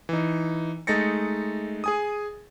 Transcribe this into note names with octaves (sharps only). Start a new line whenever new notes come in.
E3 D#4
G#3 A3 D#4 A6 A#6 C#7
G#4 G#5 D#6